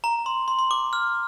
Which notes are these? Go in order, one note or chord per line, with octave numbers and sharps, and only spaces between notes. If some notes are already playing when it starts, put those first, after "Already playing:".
A#5
C6
C6
C6
D6
F6